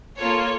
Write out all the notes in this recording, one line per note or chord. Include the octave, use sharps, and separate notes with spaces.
A#3 F4 A4 C#5